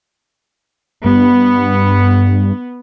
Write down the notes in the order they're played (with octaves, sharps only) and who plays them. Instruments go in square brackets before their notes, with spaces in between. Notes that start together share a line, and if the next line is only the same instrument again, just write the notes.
[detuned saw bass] G2 [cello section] B3